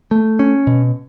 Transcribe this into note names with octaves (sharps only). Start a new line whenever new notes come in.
A3
C#4
B2